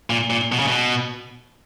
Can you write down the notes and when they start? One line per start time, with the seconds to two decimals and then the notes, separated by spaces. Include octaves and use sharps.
0.10 A#2
0.30 A#2
0.52 B2
0.59 C#3
0.67 B2